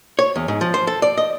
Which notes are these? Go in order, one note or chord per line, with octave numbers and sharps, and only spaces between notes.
C#5
E2
G#2
F3
C5
A4
D5
D#5